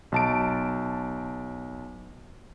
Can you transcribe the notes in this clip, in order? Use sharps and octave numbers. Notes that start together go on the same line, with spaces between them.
B1 A5 D7